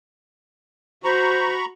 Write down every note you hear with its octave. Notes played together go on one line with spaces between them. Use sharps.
F#4 C5 A#5 B5 C#6